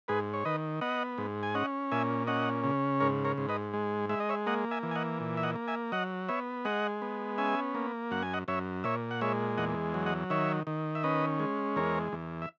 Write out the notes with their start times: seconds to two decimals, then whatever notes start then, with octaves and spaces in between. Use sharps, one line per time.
0.08 G#2 G#4 B4
0.33 C#5
0.45 D#3 B4 D#5
0.81 B3 D#5 F#5
1.18 G#2
1.43 G#5
1.54 C#4 D#5 F#5
1.92 A#2 E5 G#5
2.27 C#4 D#5 F#5
2.64 C#3
3.00 G#2 A#4 C#5
3.25 A#4 C#5
3.38 G#2
3.49 B4 D#5
3.73 G#3
4.09 G#3 E5
4.20 D#5
4.29 C#5 E5
4.47 A#3 D#5 F#5
4.71 E5 G#5
4.83 E3
4.91 G#5
4.95 D#5 F#5
5.20 A#2
5.37 E5
5.43 D#5 F#5
5.56 A#3
5.68 E5 G#5
5.92 F#3 D#5 F#5
6.28 B3 C#5 E5
6.65 G#3 D#5 F#5
7.02 B3
7.38 C#4 E5 G#5
7.75 A#3
8.11 F#2 F#5
8.23 G#5
8.34 D#5 F#5
8.48 F#2 C#5 E5
8.84 A#2 C#5 E5
9.11 F#5
9.21 G#3 C#5 E5
9.58 E2 D#5 F#5
9.94 F#3
10.06 D#5 F#5
10.30 D#3 C#5 E5
10.67 D#3
10.95 E5
11.04 C#4 B4 D#5
11.40 G#3
11.76 E2 A#4 C#5
12.12 E2
12.42 E5